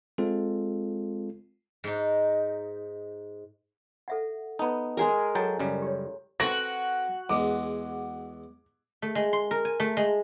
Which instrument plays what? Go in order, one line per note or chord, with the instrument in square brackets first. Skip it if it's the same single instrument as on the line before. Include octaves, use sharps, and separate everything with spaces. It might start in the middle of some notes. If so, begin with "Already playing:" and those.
[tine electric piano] G#3 C4 F4 A4
[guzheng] G#2 D#4
[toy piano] A4 E5 F#5
[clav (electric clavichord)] B3 D#4 [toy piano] A5 B5
[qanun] G#3 G#4 A#4
[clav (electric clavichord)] F#3 G5 A5 [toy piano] A4 A#5
[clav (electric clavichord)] F#2 C#3 G3
[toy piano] G4 C#5
[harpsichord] C4 A4 B4 [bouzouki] F#4 [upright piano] A#6
[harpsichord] E2 G#3 [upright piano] D6
[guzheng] A3
G#3
C6
A#4
G#5
A3
G#3